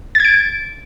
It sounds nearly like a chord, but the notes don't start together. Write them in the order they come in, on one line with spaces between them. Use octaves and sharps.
A6 G#6 D7